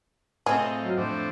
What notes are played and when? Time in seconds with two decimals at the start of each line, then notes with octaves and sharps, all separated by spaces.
0.46 A2 C4 F4 G#4 D#5
0.83 F#3
0.97 F2 A2 D4 C5